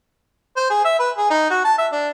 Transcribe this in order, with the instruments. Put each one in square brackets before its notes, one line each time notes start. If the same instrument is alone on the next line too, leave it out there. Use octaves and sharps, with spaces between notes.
[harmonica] C5
G#4
E5
B4
G#4
D#4
F#4
A5
E5
D4